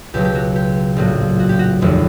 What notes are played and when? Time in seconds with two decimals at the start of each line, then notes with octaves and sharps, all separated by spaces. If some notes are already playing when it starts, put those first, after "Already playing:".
0.14 C#2 B2 F#3 G4
0.25 G4
0.35 F#4
0.56 G4
0.97 A#1 A2 F#3
1.39 F#4
1.49 G4
1.59 F#4
1.81 F1 D#2 D3